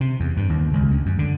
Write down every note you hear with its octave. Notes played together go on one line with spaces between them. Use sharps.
C3
E2
G2
D#2
C#2
D2
F#2
D3